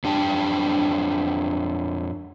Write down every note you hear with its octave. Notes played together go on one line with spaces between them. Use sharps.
F2 D4 G4 G5 A5